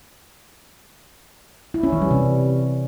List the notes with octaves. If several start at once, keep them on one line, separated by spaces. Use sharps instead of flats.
E4
C#4
E3
G3
C3